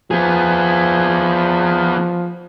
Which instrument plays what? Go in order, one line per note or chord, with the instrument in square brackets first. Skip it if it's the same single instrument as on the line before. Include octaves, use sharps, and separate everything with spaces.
[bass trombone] F3 [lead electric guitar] B3 G#4